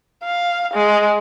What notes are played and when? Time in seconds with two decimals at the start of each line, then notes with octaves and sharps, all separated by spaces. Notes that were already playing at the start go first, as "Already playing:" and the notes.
0.24 F5
0.73 G#3